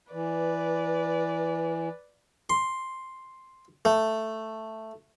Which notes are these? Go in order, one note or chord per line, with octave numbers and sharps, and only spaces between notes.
E3 B4 D5
C6
A3